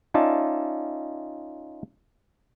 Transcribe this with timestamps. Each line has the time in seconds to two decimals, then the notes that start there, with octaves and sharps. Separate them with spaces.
0.14 C#4 D#4 F4 D5 E5 A5